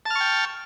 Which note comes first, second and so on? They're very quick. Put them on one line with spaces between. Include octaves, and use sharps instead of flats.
A5 F6 C#6 G5